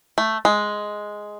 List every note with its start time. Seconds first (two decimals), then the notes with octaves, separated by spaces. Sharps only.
0.18 A3
0.45 G#3